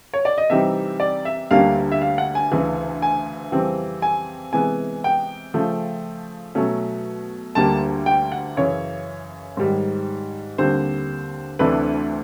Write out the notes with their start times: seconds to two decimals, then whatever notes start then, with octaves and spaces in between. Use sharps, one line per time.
0.13 C#5
0.25 D5
0.38 D#5
0.50 C3 E3 G3 C4 D#4 E5
1.00 D5
1.25 E5
1.51 D2 D3 G3 A#3 C#4 F5
1.92 E5
2.02 F5
2.18 F#5
2.35 G#5
2.52 D2 C#3 E3
3.02 G#5
3.52 F2 C#3 E3 G3 C4
4.02 G#5
4.53 C3 E3 G#3 B3 G#5
5.04 G5
5.54 C#3 F3 A3
6.55 B2 F#3 A3 C#4
7.55 D2 D3 G3 A#3 A5
8.06 G5
8.32 F#5
8.56 F#2 C#3 E3 C#5
9.57 G#2 D#3 G3
10.58 D#2 D3 G3 C4 C5
11.59 D2 C3 E3 A3 D4 B4